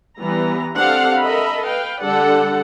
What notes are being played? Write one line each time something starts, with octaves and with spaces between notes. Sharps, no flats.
E3 G3 B3 A#5
C4 D4 G4 A4 F5 F#5
A4 A#4 D#5 E5 B5
B4 F5 G5
D3 G3 A4 D5 F#5